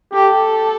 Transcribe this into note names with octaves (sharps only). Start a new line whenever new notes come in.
G4 A4